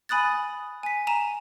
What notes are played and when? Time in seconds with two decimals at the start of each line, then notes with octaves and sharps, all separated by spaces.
0.09 G#5 B5 D#6 F#6 A6
0.83 G#5 B6
1.07 G#5 A#5 D#7 E7